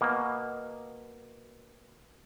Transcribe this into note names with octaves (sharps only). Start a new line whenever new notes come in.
B2 A#3